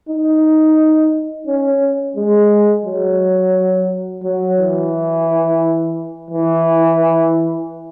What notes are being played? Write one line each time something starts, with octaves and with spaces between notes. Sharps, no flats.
D#4
C#4
G#3
F#3
F#3
E3
E3